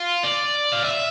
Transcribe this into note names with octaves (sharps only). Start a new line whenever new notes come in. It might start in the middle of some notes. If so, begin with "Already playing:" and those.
Already playing: F4
D5
F5
E5